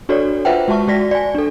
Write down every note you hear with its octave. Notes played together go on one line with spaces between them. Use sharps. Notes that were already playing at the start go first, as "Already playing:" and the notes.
D4 F#4 A4 C#5 D5
F4 B4 C5 E5 F#5 G5
G#3 F#4 E5 A5 C#6
G#3 F#4 D5 A#6 B6
D5 G#5
D4 A4